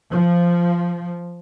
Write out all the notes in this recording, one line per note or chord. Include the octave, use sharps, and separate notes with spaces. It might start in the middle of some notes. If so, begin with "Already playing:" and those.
F3